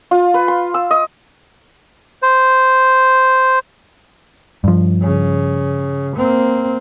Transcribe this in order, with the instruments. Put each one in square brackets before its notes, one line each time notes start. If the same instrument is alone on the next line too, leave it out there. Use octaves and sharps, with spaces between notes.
[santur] F4
B4
C6
E6
D#5
[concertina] C5
[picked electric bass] G2 F3
[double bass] C#3
A#3 C4